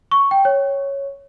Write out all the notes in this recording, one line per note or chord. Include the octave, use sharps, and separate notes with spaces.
C#6
G5
C#5